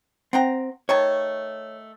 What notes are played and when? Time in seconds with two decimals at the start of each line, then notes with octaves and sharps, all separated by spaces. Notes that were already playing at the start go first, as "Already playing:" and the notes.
0.33 C4 F#5 G5 A#5
0.89 D#3 A3 C#5 A5